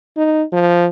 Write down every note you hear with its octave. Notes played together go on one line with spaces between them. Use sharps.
D#4
F3